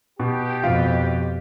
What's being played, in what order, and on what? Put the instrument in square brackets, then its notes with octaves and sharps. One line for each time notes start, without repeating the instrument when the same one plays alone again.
[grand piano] B2 [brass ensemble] G4
[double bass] F2 B2 [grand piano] F4